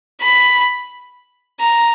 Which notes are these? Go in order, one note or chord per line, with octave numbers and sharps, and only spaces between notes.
B5
A#5